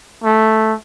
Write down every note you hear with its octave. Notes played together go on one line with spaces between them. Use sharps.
A3